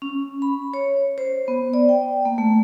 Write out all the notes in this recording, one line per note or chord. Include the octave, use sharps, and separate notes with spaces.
C#4
B5
C#5
C5
B3
D5
G5
A#3
A3